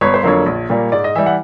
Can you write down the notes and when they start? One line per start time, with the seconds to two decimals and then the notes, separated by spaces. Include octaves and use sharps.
0.01 G1 C#5
0.14 C5
0.23 F2 D3 F#3 A#3 C#5
0.46 A#1
0.70 A#2 G3 A#3
0.92 G#2 D5
1.04 D#5
1.15 E3 G3 E5
1.26 F#5